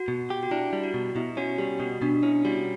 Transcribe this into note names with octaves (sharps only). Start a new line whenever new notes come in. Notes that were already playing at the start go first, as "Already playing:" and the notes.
Already playing: F#4
B2
G4
F#4
D4 E4
G3
F#4
B2
B2 E4
C#4 F#4
G3 G4
B2 F#4
B2 D4
C#4 E4
G3 F#4